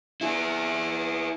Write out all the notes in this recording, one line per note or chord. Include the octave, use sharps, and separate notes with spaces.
E4 G#4